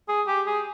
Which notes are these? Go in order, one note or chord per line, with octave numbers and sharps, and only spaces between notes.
G#4
G4
G#4